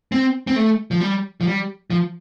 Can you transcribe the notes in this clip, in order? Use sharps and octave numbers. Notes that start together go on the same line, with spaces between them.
C4
C4
A3
F3
G3
F3
G3
F3